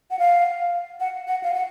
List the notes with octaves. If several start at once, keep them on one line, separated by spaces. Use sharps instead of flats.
F#5
F5
F#5
F#5
F5
F#5